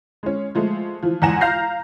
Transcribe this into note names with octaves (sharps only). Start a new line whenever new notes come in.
G#3 C#4
F3 G#3 A3
E3 F3
E2 G#2 F#5 G#5 A#6 E7
F5 A#5 F6 G6 A#6 C7